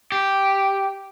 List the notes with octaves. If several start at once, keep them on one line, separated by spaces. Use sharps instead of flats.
G4